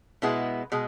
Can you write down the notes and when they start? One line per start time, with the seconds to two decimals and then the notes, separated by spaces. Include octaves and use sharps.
0.22 B2 G#3 B3 E4
0.72 B2 G#3